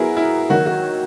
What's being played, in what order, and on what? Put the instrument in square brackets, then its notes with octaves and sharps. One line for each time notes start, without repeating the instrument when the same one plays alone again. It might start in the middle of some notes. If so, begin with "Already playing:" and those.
Already playing: [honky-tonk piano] F#3 B3 F#4 A#4 [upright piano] E4 G#4
[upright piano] E4
[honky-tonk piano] D#3 F#3 A#3 [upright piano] F#4
[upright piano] F#4